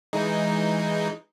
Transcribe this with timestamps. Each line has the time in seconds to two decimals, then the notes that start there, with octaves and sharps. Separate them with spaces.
0.13 E3 G#3 D#4